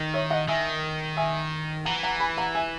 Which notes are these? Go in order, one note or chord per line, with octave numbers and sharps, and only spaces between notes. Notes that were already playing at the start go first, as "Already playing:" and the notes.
Already playing: D#3
C#5 E5
D#5 F#5
D#3 E5 G#5
E5 G#5
E3 F#5 A#5
F#5 A#5
G#5 B5
F#5 A#5
E5 G#5